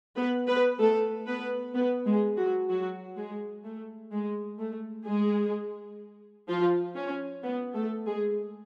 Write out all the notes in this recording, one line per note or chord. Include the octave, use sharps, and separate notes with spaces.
B3 B4
B3 B4
A3 A4
B3 B4
B3 B4
G#3 G#4
F#3 F#4
F#3 F#4
G#3 G#4
A3
G#3
A3
G#3 G#4
F3 F4
C#4
B3
A3 A4
G#3 G#4